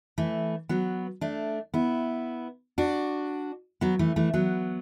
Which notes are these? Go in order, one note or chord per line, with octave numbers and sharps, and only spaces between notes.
E3 A3
F#3 B3
A3 D4
B3 E4
D4 F#4
F#3 B3
E3 A3
E3 A3
F#3 B3